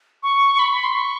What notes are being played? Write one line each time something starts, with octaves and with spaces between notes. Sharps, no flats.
C#6
B5
B5
C6
C#6